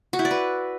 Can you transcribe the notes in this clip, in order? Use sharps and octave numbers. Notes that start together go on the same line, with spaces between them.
F#4
E4
D5
B4